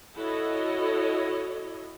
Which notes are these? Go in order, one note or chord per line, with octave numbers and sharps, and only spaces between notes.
E4 F#4 A4 C#5 D#5